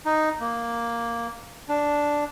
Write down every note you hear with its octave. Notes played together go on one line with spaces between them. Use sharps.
D#4
A#3
D4